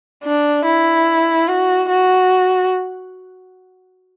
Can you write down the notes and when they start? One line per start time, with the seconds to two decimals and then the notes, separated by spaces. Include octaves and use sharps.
0.24 D4
0.66 E4
1.48 F#4
1.89 F#4